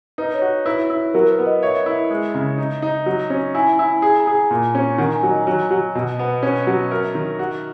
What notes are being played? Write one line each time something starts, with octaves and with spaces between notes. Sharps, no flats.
D#4 B4
C#5
F#4
E4 B4
E4
F#3 A#4
B4
B3
D#5
C#5 E5
E4
G#3
C#3
D#4
D#4
F#3
C#4
E4 G#5
E4
G#4 G#5
A#5
G#4
G#5
A#2
C#4
D#3 F#5
A#5
G#5
F#3
D#5
F#3 C#5
F#3
B2 D#5
B3
C#4
F#3
A#4 E5
D#3
F#4